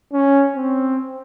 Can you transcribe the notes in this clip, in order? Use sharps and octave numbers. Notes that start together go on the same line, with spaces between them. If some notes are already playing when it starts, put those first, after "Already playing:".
C#4
C4